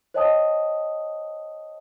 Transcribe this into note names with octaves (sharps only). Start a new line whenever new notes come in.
C5 C#5 D#5 G5 A5 D#6